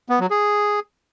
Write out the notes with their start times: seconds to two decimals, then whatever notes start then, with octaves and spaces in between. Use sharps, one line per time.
0.09 B3
0.20 F#3
0.31 G#4